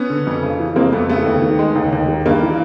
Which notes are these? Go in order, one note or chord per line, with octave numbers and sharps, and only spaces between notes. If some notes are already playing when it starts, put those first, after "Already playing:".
Already playing: B3 C#4
D3
F2
C#3
E3
F2 A#3 C4
F2 A3 B3
C#3 A3 B3
D#2
D#3
G#3
D#2
D#2
D#3
G2 A#3
E3